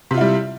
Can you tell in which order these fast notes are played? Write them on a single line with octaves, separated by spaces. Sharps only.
C3 F4 E4 G3